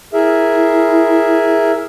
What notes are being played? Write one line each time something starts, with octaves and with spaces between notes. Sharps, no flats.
E4 G#4 A#4 E5